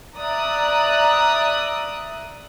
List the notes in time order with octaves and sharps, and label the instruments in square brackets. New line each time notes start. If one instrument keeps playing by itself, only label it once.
[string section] D5 E5 A#5 D#6 F#6